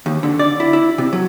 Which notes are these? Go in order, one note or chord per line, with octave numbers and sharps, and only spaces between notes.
D#2
D3
D5
E4
E4
C3
F#3